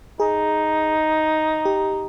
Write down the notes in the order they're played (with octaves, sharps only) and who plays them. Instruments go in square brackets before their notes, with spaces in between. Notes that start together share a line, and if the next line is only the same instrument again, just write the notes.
[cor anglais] D#4 [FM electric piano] G#4
[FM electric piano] G4